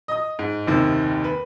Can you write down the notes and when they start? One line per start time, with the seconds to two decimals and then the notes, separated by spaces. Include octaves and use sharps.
0.08 D#5 D#6
0.39 G#2
0.67 F#1 D#2 C3 D#3
1.24 B4